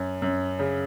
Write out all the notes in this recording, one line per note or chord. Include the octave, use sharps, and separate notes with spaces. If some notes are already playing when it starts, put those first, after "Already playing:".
Already playing: F#2
F#2
C#3